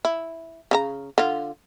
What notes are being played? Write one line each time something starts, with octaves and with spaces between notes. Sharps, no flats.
E4
C#3 D#4 A#5
D3 F4